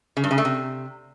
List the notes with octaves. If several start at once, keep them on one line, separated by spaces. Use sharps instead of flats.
C#3
G2
C#3
A3
C3